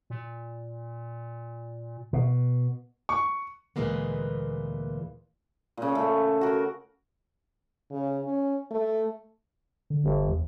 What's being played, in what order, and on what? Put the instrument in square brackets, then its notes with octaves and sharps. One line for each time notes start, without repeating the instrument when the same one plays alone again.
[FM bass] A#2
[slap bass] B2
[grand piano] C#6
[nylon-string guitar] D2 A#2 E3 G#3 A#3 B3
[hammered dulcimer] A#2 C#3
A3
F#4 A#4
[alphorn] C#3
C#4
A3
[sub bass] D3
[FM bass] G1
[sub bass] E2